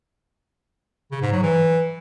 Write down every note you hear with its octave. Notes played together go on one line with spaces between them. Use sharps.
C#3
G#2
F#3
E3